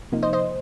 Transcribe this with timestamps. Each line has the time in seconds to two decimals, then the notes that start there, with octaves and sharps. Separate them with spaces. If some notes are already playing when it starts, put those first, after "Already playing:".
0.12 C3 F3 A#3 D#4
0.23 C5 D#5
0.33 C5 D#5